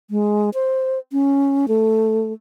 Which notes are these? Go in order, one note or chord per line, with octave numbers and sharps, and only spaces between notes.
G#3
C5
C#4
A3